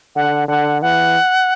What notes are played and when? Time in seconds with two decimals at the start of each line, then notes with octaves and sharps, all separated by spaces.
0.16 D3 F#5
0.48 D3 F#5
0.82 E3 F#5